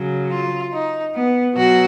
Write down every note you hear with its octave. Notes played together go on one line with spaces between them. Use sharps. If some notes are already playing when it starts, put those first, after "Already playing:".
Already playing: C#3 F#3
F4
D#4
B3
B2 F#3 F#4